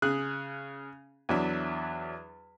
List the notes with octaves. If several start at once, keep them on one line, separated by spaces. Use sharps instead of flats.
C#3 G#4 F#6
E2 F#3 D4 E5